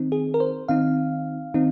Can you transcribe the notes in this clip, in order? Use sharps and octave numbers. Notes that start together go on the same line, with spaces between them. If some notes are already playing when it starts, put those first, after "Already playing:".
Already playing: D#3 C4 D#4
G#4
A#4
C5
D#3 C4 D#4 F5
D#3 C4 D#4